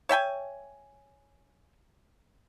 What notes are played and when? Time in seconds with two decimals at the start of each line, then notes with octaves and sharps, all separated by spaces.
0.09 C#5 E5 G5 G#5